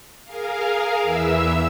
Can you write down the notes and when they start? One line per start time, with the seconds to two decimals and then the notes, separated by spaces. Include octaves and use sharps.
0.24 G#4 A#4 F5
1.03 E2 E3 E5 E6